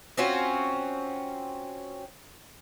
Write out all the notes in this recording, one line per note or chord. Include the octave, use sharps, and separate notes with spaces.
C4 C#4 F4 F#4